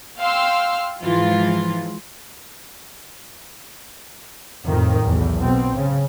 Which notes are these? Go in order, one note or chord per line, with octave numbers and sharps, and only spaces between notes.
F5 G5 C6 E6 F6
G#2 E3 F3 F4
F2 A2 D#3
B1 E2
B2 C4
C#3